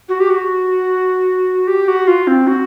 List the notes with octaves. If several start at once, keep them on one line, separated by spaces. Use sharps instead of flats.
F#4
G4
F#4
G4
F#4
F4
C4
F#4